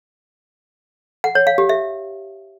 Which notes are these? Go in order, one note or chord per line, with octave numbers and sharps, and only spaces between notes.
F#5
C#5
F5
G4
E5